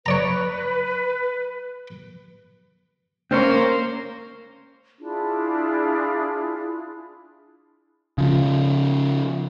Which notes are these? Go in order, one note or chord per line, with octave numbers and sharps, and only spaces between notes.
B4 C#5 D5 A#5
A#3 C4 C#4 C5 C#5
D4 E4 F4 G#4
C#3 F3